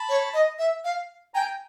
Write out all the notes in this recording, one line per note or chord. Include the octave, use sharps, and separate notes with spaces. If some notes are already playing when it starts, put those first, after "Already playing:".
Already playing: A5 B5
C#5
D#5
E5
F5
G5 G#5 A#5